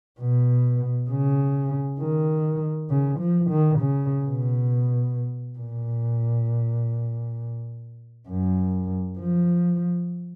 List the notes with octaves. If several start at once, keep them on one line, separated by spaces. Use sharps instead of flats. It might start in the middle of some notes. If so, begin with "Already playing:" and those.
B2
C#3
D#3
C#3
F3
D#3
C#3
B2
A#2
F#2
F3